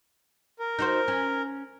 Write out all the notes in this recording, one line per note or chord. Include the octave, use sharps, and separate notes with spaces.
A#4
D#4 F#4 C5
C#4